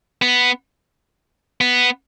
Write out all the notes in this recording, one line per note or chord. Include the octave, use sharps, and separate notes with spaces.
B3
B3